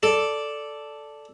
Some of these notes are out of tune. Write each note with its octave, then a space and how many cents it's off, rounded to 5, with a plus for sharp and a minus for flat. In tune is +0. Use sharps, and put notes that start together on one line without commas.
A4 +0 D5 -5